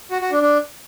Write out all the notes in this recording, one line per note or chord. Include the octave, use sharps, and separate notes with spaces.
F#4
F#4
D4
D4